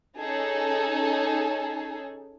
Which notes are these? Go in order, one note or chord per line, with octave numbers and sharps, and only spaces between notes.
C#4 D#4 G#4 A4